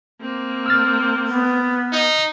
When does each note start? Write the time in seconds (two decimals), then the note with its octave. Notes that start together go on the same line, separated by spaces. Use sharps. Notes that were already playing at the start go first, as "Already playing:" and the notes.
0.21 A#3 C4
0.66 E6 F6 A6
1.27 B3
1.92 D#4